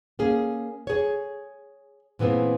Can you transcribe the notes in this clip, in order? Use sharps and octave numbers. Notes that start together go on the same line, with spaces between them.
A#3 C#4 G#4
G#4 C#5
A#2 E3 B3 C4 G#4